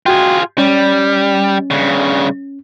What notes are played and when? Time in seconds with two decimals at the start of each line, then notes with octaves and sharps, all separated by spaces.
0.06 F4 F#4 G#4 G5
0.58 G3 C#4
1.71 G2 C#3